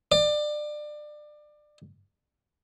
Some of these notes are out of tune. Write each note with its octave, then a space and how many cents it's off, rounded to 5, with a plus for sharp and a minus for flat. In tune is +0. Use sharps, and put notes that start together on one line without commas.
D5 +25